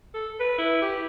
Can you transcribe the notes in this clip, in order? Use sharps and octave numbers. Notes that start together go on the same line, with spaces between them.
A4
B4
E4
G4